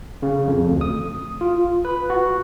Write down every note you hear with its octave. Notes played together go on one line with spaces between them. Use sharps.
C#3
F2
D2
D#6
F4
B4
F#4